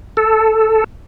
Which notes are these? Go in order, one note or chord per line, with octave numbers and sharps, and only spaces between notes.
A4